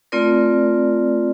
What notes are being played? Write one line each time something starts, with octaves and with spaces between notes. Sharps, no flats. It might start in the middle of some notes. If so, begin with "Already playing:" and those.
A3 C4 F4 A#4 D5